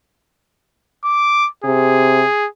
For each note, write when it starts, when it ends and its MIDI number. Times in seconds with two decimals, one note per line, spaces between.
1.04 1.48 86
1.64 2.24 48
1.64 2.47 68